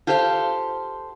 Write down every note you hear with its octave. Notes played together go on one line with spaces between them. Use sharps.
F4 G4 A4 C5 F5